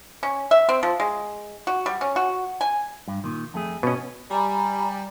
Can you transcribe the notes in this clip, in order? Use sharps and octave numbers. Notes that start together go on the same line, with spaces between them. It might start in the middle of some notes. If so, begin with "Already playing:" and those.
C#4
E5
C4
F3
G#3
F#4
G3
C#4
F#4
G#5
G2
A#2 D#3
F2 A3 G#4
B2 C#4 B4 D#5
G3 G#5 A#5 B5